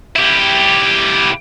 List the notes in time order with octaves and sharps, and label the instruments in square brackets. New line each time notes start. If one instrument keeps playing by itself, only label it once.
[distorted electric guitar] E4 G4